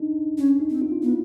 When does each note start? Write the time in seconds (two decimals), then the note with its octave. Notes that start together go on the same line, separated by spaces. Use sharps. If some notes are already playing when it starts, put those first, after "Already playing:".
Already playing: D4 D#4
0.38 C#4 D4
0.60 D#4
0.70 C4
0.82 F4
0.92 F4
1.02 B3 E4